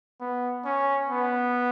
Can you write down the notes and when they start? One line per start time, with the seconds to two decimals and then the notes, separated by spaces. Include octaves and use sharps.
0.20 B3
0.65 C#4
1.09 B3